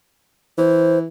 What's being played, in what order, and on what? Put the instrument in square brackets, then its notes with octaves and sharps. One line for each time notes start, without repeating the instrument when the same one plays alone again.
[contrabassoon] E3 [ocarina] C5